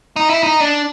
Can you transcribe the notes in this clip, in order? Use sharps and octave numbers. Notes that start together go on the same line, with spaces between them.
D#4
E4
D#4
D4